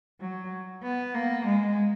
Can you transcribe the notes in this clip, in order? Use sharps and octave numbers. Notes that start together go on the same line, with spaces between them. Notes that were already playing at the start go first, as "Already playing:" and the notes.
F#3
B3
A#3
G#3